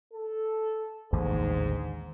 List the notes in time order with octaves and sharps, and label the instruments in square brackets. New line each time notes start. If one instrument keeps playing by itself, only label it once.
[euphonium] A4
[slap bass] A1 D#2 D3 [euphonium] G#2